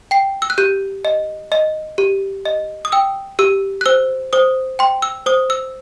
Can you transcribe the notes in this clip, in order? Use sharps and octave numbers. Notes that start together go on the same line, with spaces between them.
G5 C7
E6
F#6
G4 G6
D#5
D#5
G4
D#5
D#6
G5 E6
G4 E6
F#6
C5 E6
C5 D#6
G5 C6
E6
C5 D#6
E6